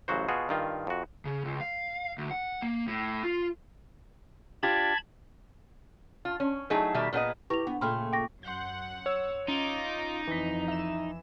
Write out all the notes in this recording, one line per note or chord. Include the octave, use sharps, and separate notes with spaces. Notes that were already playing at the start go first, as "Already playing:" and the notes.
A1 C#3 F#3 F#4 C5
B2 F4 F#4 G#4
G2 D#3 F4
F2 F#4
C#3
C#2
F5
D2
F#5
A#3
A2
F4
D4 F4 G4 A5 B5 G#6
F4
C#4
F#3 A3 D#4 E4 G#4
B2 D#3 G3 A3 E5
A#2 G3 B3 G#4 D#5
E4 G4 B4 C#6 A#6 F7
B3 D4
A#2 C#3 A3 G5 B5 C6 F6
G5 C#6 D6 A#6
F#2 F#5 C6 G6
C#5 E6
C#4 D#4 F4 D6
F2 E3 B6
E5 E7